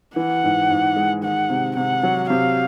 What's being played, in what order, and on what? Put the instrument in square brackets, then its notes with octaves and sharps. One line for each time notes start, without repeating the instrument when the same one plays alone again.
[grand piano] E3 [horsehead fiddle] F#5
[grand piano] G#2
G#2
G#3
[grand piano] D#3 [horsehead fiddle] F#5
[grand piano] C3
[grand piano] C3 [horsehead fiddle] F#5
[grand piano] F#3
[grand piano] C3 [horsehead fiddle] F5